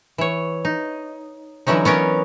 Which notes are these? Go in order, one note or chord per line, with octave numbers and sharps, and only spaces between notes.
E3 C#5
D#4
D3 E3 F#3 C#4 D#4
B3 C#4 A#4 C#5